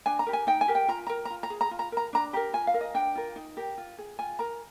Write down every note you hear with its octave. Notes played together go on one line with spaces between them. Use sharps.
D4 G#5
A#5
G4 A#4
G#5
D#4 G5
G#5
G4 A#4
G5
F4 A#5
A#4 A#5
A#5
F4
A#5
G#4
A#5
F4
A#5
A#4 A#5
D4 A#5
G4 A#4 A#5
F4 G#5
F5
A#4
D#5
D4 G5
F4 A#4
D#4
G4 A#4
F4
G#4
F4 G#5
A#4 A#5